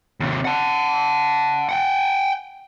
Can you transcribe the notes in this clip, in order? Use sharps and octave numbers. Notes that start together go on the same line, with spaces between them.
D#2 C3
F#5 A5
F#5 G5